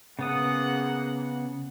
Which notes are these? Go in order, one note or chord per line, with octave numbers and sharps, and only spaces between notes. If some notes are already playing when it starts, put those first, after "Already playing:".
C#3 G#3 A#3 B3 F#5 D#6